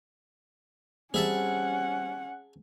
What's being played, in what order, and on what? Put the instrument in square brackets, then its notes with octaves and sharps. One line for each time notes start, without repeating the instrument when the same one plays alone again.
[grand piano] G3 C4 [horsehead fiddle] C#4 F#5 [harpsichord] G#4 E5 A5